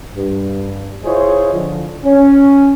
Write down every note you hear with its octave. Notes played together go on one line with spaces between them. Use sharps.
G2
E4 F4 G#4 C5 C#5 D#5
D3 F3
C#4